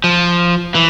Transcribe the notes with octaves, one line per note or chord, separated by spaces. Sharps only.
F3
E3